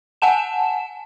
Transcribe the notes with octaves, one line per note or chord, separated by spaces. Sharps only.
F#5 G#5 A5 E7